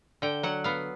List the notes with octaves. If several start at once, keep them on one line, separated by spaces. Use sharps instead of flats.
D3 G5
F#3 F#5
B3 F5